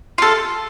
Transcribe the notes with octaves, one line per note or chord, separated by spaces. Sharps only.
F4 A4